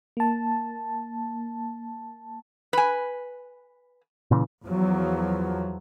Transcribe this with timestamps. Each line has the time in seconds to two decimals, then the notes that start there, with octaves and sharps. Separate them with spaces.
0.17 A#3 A5
2.73 B4 G#5
4.31 A#2 C#3 E3
4.65 E2 F3 F#3